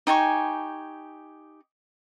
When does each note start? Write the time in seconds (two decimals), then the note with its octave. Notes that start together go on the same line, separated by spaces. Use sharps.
0.07 D#4 G4 G#5 C#6